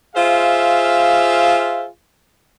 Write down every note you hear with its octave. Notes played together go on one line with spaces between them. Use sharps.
F4 G#4 C5 E5 F5